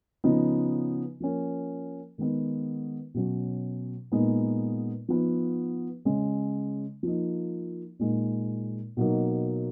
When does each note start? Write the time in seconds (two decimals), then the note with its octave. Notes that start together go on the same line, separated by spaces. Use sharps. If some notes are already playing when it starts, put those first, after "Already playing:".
0.24 C#3 F3 B3 D#4
1.20 F3 A#3 C#4
2.18 D#3 G#3 B3 D#4
3.14 B2 F#3 C#4
4.12 A#2 G#3 B3 D#4
5.09 F3 B3 D#4
6.05 C#3 G#3 C#4
7.03 F3 A#3 D#4
7.99 A#2 G#3 D#4
8.97 B2 F#3 A#3 D#4